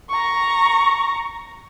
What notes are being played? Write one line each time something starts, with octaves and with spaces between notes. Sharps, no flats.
A#5 C#6